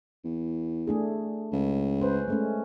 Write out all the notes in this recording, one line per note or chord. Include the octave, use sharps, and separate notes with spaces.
E2
A3 D4 G#4
C#2
C#4 B4 C5
G#3 A3 C#4